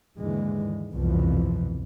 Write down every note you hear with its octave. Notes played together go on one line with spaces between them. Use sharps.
D#2 G#2 D3 E3 G#3
G1 C2 F2 B2 E3 F3